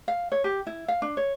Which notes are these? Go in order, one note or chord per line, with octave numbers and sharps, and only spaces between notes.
F5
C#5
G4
E4
F5
D4
C#5